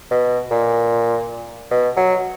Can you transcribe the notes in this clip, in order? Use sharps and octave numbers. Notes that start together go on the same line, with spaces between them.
B2
A#2
B2
F#3